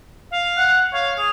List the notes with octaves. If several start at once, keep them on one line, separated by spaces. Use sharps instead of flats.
F5
F#5
C#5 F5
G#4 F7